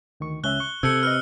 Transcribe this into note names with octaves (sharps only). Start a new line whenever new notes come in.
D2 D#3 C#6
C#2 C#4 E5 F#6 G7
C#6
C3 A4 E6 G6 G#6 C#7
B4 D#5 F6